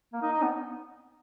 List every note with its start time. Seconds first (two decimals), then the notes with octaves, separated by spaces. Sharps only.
0.13 A#3
0.22 D#4
0.32 D#4
0.42 B3